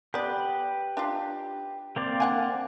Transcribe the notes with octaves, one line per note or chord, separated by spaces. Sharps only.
B3 G4 B4 D5
D4 D#4 F4
A#3 C4 D5
D4 F#5 G#5